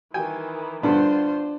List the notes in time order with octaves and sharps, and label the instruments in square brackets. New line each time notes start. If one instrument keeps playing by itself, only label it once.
[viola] D#3 E3 [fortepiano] G5 G#5
[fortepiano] G2 D3 B3 [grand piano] D4 [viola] F4 C5